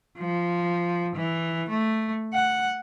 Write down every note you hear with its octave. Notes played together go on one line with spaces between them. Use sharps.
F3
E3
A3
F#5